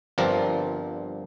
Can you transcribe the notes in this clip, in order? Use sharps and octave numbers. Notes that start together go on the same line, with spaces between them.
G1 G2 F3 C4 A#4 D5